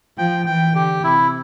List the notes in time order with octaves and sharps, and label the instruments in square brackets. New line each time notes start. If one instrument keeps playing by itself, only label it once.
[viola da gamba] F3 [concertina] G5
[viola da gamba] E3 [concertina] G5
[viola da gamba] D3 [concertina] G4
[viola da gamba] C3 [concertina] E4